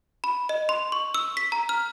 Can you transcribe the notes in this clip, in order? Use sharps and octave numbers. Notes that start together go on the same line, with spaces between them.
B5
D#5
C6
C#6
E6
B6
A#5
F6